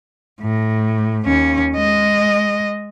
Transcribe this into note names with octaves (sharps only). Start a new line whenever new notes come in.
A2
D#2 C#4
G#3 D#5